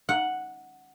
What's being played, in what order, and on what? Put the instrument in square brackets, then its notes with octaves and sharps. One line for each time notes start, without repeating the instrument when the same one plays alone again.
[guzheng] F#5